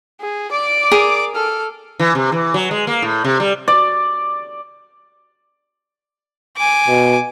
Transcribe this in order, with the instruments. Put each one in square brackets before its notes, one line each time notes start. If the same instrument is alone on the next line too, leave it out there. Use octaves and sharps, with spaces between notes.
[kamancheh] G#4
D5 D6
[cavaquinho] G#4 A#4
[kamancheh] A4 F6
[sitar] E3
C3
E3
F#3
G#3
A#3
A2
C3
G3
[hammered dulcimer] D5
[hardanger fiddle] G#5 D6
[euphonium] B2